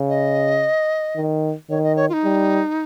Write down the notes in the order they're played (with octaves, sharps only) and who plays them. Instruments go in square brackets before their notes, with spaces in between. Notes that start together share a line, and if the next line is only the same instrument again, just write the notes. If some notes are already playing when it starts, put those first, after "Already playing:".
Already playing: [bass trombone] C#3
[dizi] D#5
[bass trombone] D#3
[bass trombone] D#3 [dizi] C#5
[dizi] D#5
C#5
F4
D#4
[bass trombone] G3